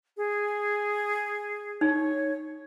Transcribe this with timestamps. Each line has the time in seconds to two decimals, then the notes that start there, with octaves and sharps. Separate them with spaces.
0.17 G#4
1.81 D#4 C#5